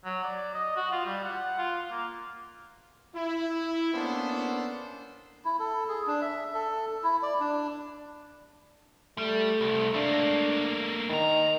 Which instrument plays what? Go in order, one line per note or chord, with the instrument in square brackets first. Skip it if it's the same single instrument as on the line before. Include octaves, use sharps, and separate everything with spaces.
[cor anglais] F#3
D5
D#5
F#4
F4
G3
F#5
F4
A#3
[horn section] E4
A#3 B3 C#4 D4 A4 C5
[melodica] E4
A4
G#4
D4
E5
A4
E4
D5
D4
[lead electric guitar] G3 [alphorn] A3
[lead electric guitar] C2
[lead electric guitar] A3 A#3 [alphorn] D4
[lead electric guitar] D2 A#5 [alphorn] D#3